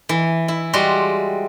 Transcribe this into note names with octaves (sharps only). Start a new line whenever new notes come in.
E3
E4
G3 G#3 F#4 C6